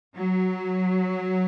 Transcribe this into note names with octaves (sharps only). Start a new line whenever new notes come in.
F#3